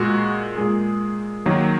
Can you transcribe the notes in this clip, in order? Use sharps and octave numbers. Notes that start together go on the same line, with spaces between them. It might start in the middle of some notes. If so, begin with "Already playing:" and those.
Already playing: A#2 G#3 F#4
A#2 G#3 G#4
D#3 F#3 A#3